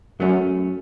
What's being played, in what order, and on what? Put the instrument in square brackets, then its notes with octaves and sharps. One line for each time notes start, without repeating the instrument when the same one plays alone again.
[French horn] F#2 [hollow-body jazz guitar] F#3 A3 C#4